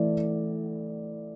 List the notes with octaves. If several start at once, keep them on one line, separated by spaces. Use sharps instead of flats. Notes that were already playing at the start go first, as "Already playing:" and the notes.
Already playing: E3 A3 E4 A4 D5